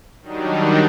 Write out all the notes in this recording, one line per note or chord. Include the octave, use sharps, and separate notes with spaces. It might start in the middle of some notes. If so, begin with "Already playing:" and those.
D#3 F#3 G3 D4 D#4